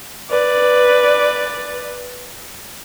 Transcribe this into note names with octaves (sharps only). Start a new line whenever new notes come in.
B4 D5